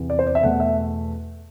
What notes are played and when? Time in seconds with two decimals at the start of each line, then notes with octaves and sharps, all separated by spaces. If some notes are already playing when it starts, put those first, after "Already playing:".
Already playing: E2 C3 E3 B3
0.10 D5
0.19 C5
0.27 D5
0.35 E5
0.43 E2 B2 A3 F#5
0.60 E5